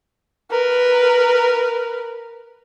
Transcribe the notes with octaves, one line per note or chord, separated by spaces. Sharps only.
A#4 B4